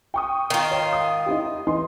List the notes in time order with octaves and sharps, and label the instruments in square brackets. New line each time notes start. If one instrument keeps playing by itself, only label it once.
[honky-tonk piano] G5 C#6 D#6
[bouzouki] D#3 F4
[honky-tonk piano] C#5
D#6
D#4 E4 G4
E3 D#4 C6